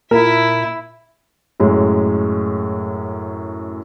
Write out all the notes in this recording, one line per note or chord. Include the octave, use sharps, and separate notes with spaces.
A#2 E4 A#4 E5
F#2 A2 G#3